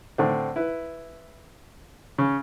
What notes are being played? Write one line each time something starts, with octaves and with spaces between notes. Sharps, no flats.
A2 D3 C4
E4 B4
C#3 C#4